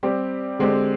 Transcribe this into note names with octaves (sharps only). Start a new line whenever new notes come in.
G3 C4 G4
D3 G#3 C4 G4